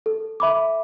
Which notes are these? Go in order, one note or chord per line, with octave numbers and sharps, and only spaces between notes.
A4
E5 B5 D6